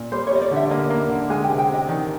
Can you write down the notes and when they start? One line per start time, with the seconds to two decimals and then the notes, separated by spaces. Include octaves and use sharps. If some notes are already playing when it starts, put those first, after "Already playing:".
Already playing: A#2
0.12 G3 C5
0.27 C#5
0.31 G3 D#5
0.42 D5
0.51 D3 E5
0.71 A#3 D#5
0.90 A#3
1.09 D3
1.30 G#3 G#5
1.44 G5
1.50 C3
1.59 G5
1.69 C3 D#5
1.88 D#3 D5